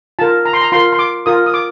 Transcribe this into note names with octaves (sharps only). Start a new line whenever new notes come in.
F4 A#4 A5
A#5
C6
A#5
F4 A#4 C6
C6
D6
F4 A#4 D#6
D#6
D6